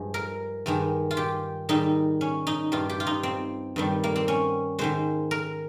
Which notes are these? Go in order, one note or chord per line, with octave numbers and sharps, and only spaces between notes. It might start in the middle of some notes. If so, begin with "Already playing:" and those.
Already playing: G2 F3 G#3
A#4
G2 D#3 G#3
F4
G4
G#2 D#3 G3 D#4
C#4
D#4
G2 G3 F4
G4
F4
D#4
C4
G2 D#3 G3
A#3
C4
C#4
G#2 D#3 G#3 C5
A#4